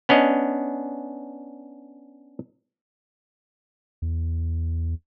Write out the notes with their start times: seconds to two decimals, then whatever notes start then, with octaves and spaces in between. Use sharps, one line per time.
0.09 B3 C#4 D4 D#5
4.02 E2